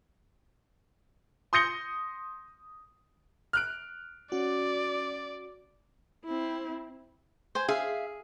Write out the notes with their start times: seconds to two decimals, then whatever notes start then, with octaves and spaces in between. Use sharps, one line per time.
1.53 C6 D#6 G6 A#6 C#7 G7
3.53 F6 F#6 D7
4.32 C#4 F#4 D5
6.25 C4 E4
7.55 C5 G#5
7.68 G#4 E5 F5